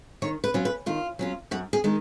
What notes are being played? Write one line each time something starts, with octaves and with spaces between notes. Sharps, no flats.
D#3 C#5
B4
F#3 C#4 F4
B4
D#3 F4
F#3 C#4 F4
F#2 F#4
G#4
D#3 G#3 D#4